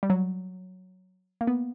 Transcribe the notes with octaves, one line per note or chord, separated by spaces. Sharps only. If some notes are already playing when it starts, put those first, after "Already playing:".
G3
F#3
A#3
B3